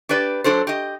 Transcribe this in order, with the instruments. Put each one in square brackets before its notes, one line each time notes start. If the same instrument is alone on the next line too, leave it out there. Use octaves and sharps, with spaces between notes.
[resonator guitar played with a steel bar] D4 G4 B4 D5
F#3 D4 A4 C5
G4 D#5